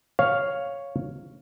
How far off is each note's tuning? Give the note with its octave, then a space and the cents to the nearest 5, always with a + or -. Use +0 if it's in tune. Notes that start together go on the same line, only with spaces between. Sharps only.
C#5 +0 F5 +0